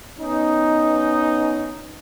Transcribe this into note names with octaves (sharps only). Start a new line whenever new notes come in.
B3 C#4 D#4